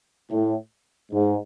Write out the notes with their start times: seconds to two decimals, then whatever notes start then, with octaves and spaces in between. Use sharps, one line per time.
0.31 A2
1.12 G#2